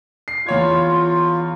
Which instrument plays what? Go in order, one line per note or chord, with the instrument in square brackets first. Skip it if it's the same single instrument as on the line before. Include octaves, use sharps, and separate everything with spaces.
[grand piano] C7
[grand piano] E2 C#5 G#6 [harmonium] F4